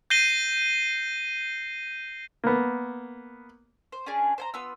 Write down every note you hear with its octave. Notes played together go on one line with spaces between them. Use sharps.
G6 A#6 C7 D#7 G7
A#3 B3
C5
C#4 D4 G#4
C5 G#5 A#5
B3 F4 E6